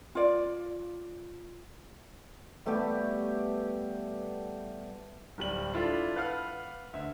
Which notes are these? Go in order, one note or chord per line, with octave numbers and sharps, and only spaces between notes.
F4 D5
G3 A3 B3 G4
D1 G3 F#7
D4 E4 F4 A4
B4 F5 F#5 F6
D2 E5